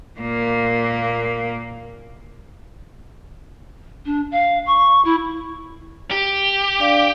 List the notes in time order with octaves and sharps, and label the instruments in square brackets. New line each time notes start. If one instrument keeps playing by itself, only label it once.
[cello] A#2 A#3
[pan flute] D4
F5
C#6
E4
[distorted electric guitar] G4
[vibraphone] D4 D5 F5